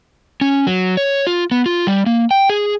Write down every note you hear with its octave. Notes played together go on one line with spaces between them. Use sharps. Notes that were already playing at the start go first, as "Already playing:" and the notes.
C#4
F#3
C#5
F4
B3
F4
G3
A#3
G5
G#4